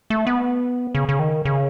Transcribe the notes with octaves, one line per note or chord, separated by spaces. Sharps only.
A3
B3
C#3
C#3
D#3
C#3